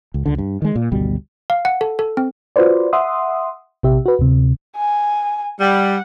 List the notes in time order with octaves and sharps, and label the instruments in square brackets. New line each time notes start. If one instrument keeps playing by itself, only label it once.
[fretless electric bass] C#2
C#2 D3
G2
D#3 G#3
A#2
G#1 D2 B2 G3
[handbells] F5
F#5
A4
A4
C4
[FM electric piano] F4 F#4 B4 C5 D5
E5 F#5 C6 D#6
A#1 C3 G4 E5
F#4 B4
D2 C3
[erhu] G#5
[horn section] G3 [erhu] F#5